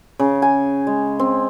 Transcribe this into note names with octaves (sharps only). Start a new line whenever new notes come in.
C#3
G#5
G#3
C4